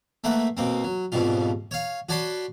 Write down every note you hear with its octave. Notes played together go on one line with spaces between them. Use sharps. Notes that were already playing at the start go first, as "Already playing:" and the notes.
A3 A#3 B4 F#5
B2 A#3 C4
F#3
F2 G#2 B2 G3 F4
C#5 F5
F#4 C#5 D5 A5 B5 C6